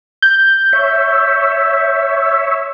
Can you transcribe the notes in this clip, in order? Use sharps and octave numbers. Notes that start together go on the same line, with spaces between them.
G6
C#5 E5